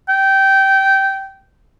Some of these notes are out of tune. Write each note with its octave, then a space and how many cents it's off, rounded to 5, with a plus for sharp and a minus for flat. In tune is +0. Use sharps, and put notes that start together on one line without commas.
G5 -15